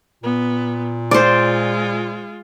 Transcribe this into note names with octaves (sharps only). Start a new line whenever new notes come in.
A#2 B3
G#3 F4 C5 D5